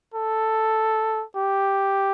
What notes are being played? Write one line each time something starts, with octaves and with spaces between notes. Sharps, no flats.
A4
G4